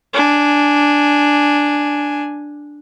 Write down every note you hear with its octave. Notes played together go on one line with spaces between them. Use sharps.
D4 G#5